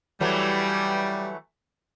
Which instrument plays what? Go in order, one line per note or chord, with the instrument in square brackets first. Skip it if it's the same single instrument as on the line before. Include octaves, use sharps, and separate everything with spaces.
[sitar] E3 F#3 A3 [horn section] G3